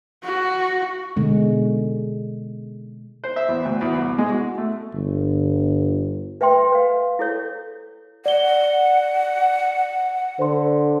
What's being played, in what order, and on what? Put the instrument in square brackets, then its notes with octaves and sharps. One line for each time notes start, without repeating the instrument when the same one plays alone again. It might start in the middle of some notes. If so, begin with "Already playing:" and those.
[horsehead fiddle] F#4
[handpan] B2 D3 G#3
[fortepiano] C5
E5
E2
D2
E2
C2
G#3
F#4
A3
[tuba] G1
[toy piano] B4 E5 G5 C6
B4 F5
E4 A4 C#5
[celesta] D5 G7 [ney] F#5
[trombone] D3 [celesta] C5 C6